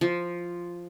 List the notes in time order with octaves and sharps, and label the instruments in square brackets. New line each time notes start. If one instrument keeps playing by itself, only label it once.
[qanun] F3